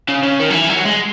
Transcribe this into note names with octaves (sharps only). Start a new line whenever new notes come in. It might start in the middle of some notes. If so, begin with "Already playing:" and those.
C#3
C#3
D#3
F#3
E3
F#3
G#3